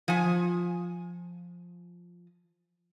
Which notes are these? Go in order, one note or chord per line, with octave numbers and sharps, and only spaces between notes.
F3 G#5